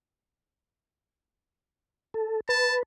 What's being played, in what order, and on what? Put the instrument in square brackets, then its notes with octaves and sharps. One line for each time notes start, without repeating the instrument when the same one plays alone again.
[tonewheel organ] A4
[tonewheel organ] B4 [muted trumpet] A5